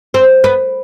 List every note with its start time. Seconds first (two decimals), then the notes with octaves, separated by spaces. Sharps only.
0.14 C4
0.44 B3